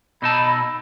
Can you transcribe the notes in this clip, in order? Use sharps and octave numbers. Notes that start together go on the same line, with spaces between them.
B2 D#4 A5 B5 E6